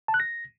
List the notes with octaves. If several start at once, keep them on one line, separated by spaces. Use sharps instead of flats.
A5
F#6
A#6